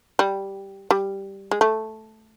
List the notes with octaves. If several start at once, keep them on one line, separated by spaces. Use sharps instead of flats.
G3
G3
G#3
A3